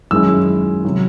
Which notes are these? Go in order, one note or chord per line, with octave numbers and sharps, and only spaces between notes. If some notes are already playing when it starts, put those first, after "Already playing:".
F#2 D#3 G#3 C#4 E4 E6
C3 D#3 F#3